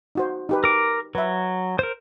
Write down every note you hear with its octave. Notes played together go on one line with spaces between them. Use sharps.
D#4 F#4 C5
D#4 G4 B4
A#4 D6
F#3 B4 E5
A#4 C5